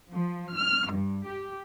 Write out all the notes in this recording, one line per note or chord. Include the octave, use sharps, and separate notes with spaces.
F3
F6
G2
G4